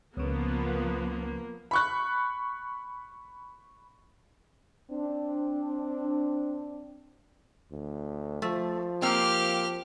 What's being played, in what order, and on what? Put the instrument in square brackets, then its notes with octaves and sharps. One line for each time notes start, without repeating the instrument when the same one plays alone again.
[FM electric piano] C#2 C#3 [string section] F3 B3 [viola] A#3 A#4
[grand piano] B5 C#6 F#6
[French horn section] C4 D4
[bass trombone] D2
[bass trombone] F3 [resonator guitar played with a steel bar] A3
[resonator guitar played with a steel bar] A#3 C4 [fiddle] G4 F6